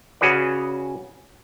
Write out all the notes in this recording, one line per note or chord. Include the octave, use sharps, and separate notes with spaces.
C#3 C#4 F#4 G#4 B4 D5